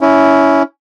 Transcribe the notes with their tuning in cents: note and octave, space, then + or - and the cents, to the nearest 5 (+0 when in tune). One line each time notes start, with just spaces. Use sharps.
C#4 +15 E4 -10